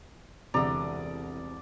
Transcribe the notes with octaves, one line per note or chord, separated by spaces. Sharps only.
E1 C2 D3 D5 A#5 D#6